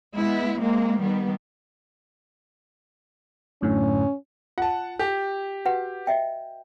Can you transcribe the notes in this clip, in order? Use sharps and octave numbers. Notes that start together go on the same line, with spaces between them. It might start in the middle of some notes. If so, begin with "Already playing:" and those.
G#3 B3 E4
G#3 A#3 C4
D#3 G3 B3
F#2 A2 D3 C#4
F4 F#5 A5
G4
F#4 B4 F#5
D#5 E5 G5